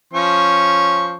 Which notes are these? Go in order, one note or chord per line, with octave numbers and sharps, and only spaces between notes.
F3 C#4 C#6